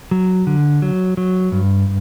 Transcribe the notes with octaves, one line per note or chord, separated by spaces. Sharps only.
F#3
D3
F#3
F#3
G2